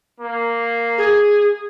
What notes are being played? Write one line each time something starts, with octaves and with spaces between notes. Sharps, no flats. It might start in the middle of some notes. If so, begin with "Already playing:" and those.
A#3
G#4